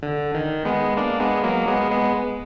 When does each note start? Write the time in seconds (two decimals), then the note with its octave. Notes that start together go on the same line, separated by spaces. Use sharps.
0.03 D3
0.34 D#3
0.65 G#3 B3
0.97 A#3 D4
1.20 G#3 B3
1.44 F#3 A#3
1.68 G#3 B3
1.91 G#3 B3